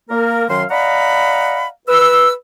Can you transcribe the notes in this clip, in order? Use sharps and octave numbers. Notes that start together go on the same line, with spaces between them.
A#3 A#4
F#2 D#3 F#3 F5 C6
D5 D#5 F5 F#5 A#5 B5
B4 E6